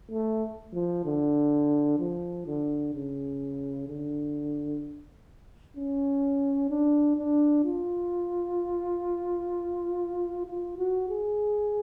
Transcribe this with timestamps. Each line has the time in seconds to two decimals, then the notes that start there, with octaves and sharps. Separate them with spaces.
0.11 A3
0.73 F3
1.05 D3
1.99 F3
2.47 D3
2.94 C#3
3.88 D3
5.76 C#4
6.70 D4
7.17 D4
7.65 F4
10.47 F4
10.78 F#4
11.10 G#4